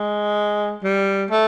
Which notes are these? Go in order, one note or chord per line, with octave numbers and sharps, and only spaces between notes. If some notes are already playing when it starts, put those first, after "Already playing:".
Already playing: G#3
G3
A3